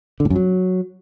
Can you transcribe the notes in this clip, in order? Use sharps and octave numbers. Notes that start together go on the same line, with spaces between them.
D3
A2
F#2
F#3